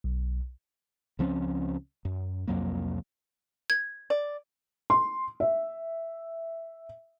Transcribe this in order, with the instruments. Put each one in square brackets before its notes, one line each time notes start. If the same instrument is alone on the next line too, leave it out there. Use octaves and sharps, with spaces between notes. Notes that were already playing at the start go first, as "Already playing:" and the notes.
[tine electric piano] B1
[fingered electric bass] C#2 F3 C4 C#4
F#2
C2 F2 F#3 A#3
[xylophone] G#6
[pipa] D5
[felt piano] C6
E5